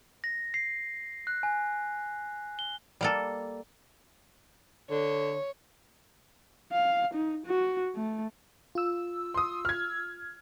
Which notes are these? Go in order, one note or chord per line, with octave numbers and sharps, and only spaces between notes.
A#6
C7
F#6
G#5
G7
G3 A#3 A4
D3 C#5
F5
D#4
F#4
A3
F4 E6
C6 D#6
F6 G#6